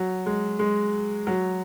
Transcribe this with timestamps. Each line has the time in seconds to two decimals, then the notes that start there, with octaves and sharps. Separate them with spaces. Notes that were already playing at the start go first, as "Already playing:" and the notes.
Already playing: F#3
0.26 G#3
0.59 G#3
1.27 F#3